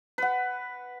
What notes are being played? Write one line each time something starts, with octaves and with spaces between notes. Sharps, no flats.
B4 F#5